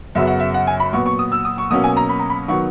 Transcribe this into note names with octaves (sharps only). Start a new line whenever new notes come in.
F#2 C#3 F#3 B3 E5
F#5
E5
F#5
G#5
B5
A#2 F#3 B3 C#6
C#6
D#6
E6
D#6
C#6
B2 F#3 A#3 C#4 D#6
G#5
A#5
B5
A#5
B5
D#3 F#3 B3 C#6